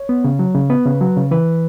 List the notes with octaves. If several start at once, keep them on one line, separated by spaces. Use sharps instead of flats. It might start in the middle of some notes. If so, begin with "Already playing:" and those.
Already playing: C#5
B3
C#3
F#3
C#3
B3 B4
C#3
F#3
C#3
E3 B4